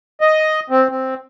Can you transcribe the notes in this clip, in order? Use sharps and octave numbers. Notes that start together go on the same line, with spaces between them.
D#5
C4
C4